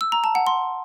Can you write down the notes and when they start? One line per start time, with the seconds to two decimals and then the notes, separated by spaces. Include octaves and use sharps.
0.01 E6
0.12 A#5
0.24 A5
0.35 F#5
0.47 C6